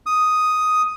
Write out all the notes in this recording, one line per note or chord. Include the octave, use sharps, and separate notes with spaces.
D#6